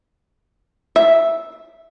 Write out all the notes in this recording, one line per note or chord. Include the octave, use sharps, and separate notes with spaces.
E5